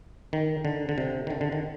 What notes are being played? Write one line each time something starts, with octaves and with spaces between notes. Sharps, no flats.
D#3
D3
D3
C3
D#3
D3
D3
D#3